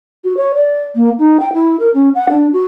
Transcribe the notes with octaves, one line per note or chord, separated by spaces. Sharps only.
F#4
C#5
D5
A#3
D#4
G5
E4
A#4
C#4
F#5
D4
F#4